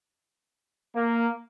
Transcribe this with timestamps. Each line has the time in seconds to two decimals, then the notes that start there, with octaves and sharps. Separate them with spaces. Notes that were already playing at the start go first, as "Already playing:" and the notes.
0.95 A#3